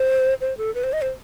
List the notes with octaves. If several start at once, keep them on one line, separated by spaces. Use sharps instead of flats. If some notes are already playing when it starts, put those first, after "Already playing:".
Already playing: C5
C5
A4
B4
C5
D#5
C5